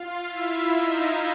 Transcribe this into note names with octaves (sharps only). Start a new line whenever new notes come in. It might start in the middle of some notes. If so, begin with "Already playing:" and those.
Already playing: F4 F5
E4 E5
D#4 D#5